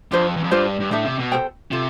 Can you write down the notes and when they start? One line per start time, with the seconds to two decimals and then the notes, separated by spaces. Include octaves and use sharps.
0.11 F2 D4 F4 C5
0.36 E2
0.44 F2
0.51 G2 D4 F4 C5
0.80 G2
0.91 A2 D4 A4 E5
1.04 C3
1.19 B2
1.32 A4 C5 G5
1.71 C3 F4 A4